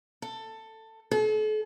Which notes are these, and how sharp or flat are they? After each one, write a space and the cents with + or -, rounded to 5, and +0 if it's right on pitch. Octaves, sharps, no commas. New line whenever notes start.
A4 +15
A4 -40